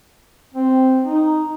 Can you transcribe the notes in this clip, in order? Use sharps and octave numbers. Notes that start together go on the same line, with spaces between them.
C4
D#4